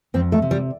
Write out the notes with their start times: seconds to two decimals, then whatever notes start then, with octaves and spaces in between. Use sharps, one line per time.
0.14 F2 C4
0.32 A3
0.42 C3
0.51 G3